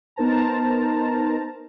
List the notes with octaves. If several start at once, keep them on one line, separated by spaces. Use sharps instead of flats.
B3 D#4 A#4 C5 A5 A#5